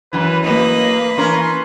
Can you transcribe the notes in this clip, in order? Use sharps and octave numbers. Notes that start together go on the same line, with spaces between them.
F#2 E3 B4
A#3 B4 D#5
E3 C#4 A#4 C6